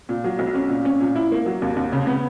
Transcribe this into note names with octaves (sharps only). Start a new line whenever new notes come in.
A#2
F#3
B1
C#4
A#2
C#4
A#2
E4
A#3
F#3
D#2
D#2
C#3
B3